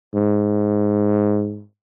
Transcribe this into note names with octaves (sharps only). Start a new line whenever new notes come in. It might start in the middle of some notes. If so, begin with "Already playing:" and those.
G#2